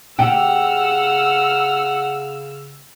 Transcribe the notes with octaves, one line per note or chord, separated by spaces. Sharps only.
C#3 G4 F#5 E6 F6